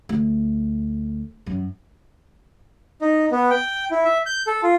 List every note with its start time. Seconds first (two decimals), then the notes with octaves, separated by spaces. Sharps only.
0.09 D2
1.46 F#2
3.02 D#4
3.32 B3
3.51 G5
3.91 E4
4.05 E5
4.26 G6
4.47 A4
4.63 F4